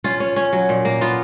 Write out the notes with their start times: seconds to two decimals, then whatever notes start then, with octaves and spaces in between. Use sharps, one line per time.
0.04 C#4 F4
0.20 C#4
0.36 C#4
0.53 F#3
0.69 A#2
0.85 A#3
1.01 B3 F4